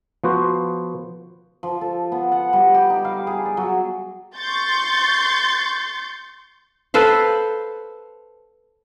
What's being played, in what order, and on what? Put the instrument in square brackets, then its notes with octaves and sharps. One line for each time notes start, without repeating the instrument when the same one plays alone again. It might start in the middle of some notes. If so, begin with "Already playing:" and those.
[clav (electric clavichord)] F3 B3 F#4 C5
[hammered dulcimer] F3
A4
B3
F#5
G3
G4
D#4
F5
G#4
D5
F#3
[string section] C6 C#6 G6 A6
[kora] A4 B4 C5 F5